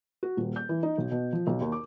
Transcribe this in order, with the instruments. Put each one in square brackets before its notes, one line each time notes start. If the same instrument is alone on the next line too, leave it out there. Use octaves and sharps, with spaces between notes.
[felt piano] F#4
D#1
G6
E3
D#4
B1
B2
F3
B1
D#2
D6